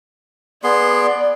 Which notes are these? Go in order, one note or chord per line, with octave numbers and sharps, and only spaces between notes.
B3 G#4 D5 C6